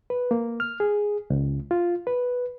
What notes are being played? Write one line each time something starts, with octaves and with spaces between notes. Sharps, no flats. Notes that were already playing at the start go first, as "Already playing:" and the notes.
B4
A#3
F6
G#4
C#2
F4
B4